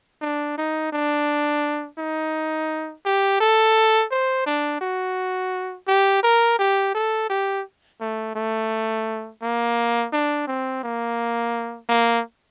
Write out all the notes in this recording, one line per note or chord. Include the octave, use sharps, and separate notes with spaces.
D4
D#4
D4
D#4
G4
A4
C5
D4
F#4
G4
A#4
G4
A4
G4
A3
A3
A#3
D4
C4
A#3
A#3